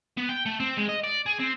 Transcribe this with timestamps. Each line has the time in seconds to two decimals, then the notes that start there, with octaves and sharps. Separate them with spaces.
0.17 B3
0.29 G5
0.46 A3
0.60 C4
0.77 G#3
0.89 D#5
1.04 D5
1.26 G#4
1.39 C4